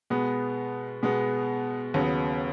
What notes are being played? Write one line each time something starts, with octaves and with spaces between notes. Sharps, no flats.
B2 G#3 B3
B2 G#3 B3
D#2 C#3 F#3 B3